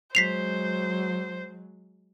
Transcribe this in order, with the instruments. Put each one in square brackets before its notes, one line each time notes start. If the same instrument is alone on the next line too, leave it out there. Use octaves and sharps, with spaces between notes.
[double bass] F#3 G#3 [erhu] C5 [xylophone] B6 C7 F7